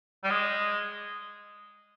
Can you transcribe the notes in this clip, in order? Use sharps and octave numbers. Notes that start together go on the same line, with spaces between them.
G3
G#3